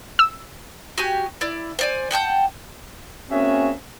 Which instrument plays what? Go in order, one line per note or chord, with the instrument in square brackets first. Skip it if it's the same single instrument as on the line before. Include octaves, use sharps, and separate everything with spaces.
[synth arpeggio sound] E6
[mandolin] F#4 G4 G#5
E4 D5
C5 D5 G#5
F#5 G5 A5 G6
[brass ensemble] A#3 C4 C#4 F#4 G#4 E5